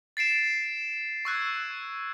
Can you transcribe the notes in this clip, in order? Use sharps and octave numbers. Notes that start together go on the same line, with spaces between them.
A6 C7 D7 E7
C#6 E6 F#6 G#6